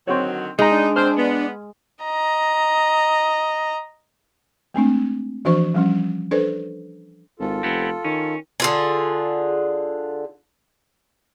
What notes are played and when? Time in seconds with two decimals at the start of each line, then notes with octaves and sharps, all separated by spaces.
0.07 D3 D#3 F#3 C4 F#4 C#5
0.59 G#3 D#4 D#5 A#5
0.71 D4
0.96 C4 C5 G#5 C6 F6
1.17 B3
2.04 D#5 A#5
4.74 G#3 A3 C4 D4
5.45 E3 F3 D4 F#4 C5 C#6
5.75 F3 G3 C#4
6.31 D4 A4 B4 C5 D5
7.39 G#1 F4 A4
7.63 F1 B3 C4
8.05 D#3 C#4
8.60 D3 F4 G#4